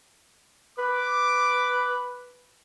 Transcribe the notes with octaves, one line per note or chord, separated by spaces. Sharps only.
B4 D6